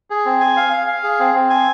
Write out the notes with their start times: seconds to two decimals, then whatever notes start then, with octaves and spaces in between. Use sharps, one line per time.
0.10 G#4
0.26 C4
0.41 G#5
0.57 F5
0.73 F5
0.87 F5
1.03 G#4
1.19 C4
1.35 C4
1.50 G#5